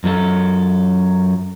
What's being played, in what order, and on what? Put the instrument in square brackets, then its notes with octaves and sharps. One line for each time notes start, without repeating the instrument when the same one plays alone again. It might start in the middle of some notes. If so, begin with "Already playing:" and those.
[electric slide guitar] F#2 F#3 A4